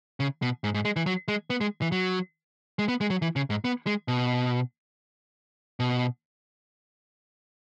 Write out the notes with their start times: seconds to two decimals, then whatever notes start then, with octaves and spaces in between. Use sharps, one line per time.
0.20 C#3
0.42 B2
0.64 G#2
0.74 G#2
0.85 G#3
0.96 E3
1.06 F#3
1.28 G#3
1.50 B3
1.61 G#3
1.82 E3
1.92 F#3
2.79 G#3
2.89 B3
3.01 G#3
3.10 F#3
3.22 E3
3.36 C#3
3.50 G#2
3.65 B3
3.87 G#3
4.08 B2
5.80 B2